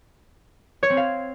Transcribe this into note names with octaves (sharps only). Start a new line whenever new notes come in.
C#5
C4
F5